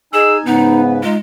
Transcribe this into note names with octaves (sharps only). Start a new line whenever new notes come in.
D#4 G#4 G#5 E6
G#2 C#3 B3 D#4 B4
G#3 D#4 F4